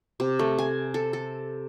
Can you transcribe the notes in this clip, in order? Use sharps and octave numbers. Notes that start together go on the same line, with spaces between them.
C3
A3
G#5
A4
A4